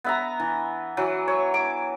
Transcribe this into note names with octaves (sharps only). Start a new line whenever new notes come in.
B3 E5 A#5
E3
E3 F#3
C#5
D6